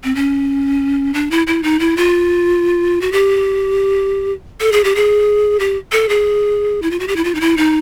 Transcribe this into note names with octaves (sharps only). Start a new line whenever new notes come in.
C4
C#4
D4
E4
E4
D#4
E4
F4
F#4
G4
A4
G#4
G4
G#4
G4
A4
G#4
E4
F4
F#4
G4
E4
F4
D#4
E4
D#4